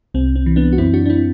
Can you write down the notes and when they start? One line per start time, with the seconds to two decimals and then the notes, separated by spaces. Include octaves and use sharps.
0.14 C2 C4
0.36 C4
0.46 E3
0.56 B3 D4
0.72 F#4
0.78 F#2 C4 E4
0.94 D4 F#4
1.06 D4
1.10 C4 E4